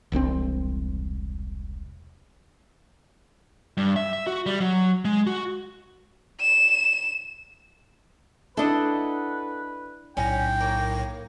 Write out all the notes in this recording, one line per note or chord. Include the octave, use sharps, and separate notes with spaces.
E1 C2 A#2 C4
G2
E5
E5
F#4
G3
F#3
G#3
F#4
E7
D4 E4 A4 B4 D#5 F#5
B1 A2 C#4 G5 A#6
A#3 C#5